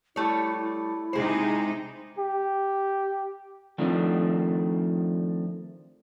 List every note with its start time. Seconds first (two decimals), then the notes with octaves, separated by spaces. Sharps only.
0.16 G3 A3 E4 C#5
0.57 E4
1.13 C3 G#3 D#4 G#4 C5
2.18 G4
3.78 D#3 F3 A3 C4 D4